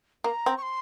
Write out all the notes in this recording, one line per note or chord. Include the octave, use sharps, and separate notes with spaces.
A#3 A#5
C4
C#6
C6